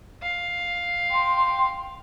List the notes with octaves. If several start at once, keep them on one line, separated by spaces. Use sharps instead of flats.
F5
G5 C6